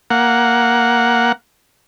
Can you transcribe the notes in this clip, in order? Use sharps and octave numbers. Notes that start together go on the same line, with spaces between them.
A#3 F#5